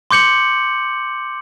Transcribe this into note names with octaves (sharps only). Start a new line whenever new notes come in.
C6 D6 G6 C#7 F#7